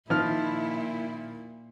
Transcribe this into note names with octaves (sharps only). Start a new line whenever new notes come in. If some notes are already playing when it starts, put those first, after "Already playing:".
A#2 D#3 F3 E4 F6